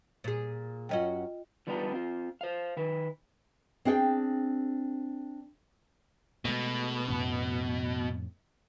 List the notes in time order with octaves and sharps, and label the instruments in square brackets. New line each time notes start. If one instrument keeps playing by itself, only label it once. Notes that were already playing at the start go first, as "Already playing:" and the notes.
[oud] A#2 G#4
[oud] F#2 C#4 F#4 [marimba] F4 D#5 G5
[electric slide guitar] E3 G3 B3 D4 D#4 F4
C4 F4
C5 F5
D#3 B4
[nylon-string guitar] C4 D4 G#4 F#5 G5
[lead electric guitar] B2 [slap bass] G#3 A3
[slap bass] F2 A2 C#4